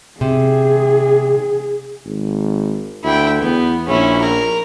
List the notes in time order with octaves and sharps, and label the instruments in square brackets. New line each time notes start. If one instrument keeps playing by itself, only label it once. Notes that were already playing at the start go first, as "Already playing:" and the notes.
[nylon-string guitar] C3 [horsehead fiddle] G#4
[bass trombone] G#1
[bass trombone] D2 [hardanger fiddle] E4 G5
[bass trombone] E2 [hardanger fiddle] B3
[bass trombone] A#1 [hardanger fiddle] C#4 E4
[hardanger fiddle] A#4